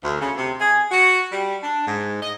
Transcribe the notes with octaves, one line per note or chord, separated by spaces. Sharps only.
D2
C#3
C3
G#4
F#4
G3
D4
G#2
D#5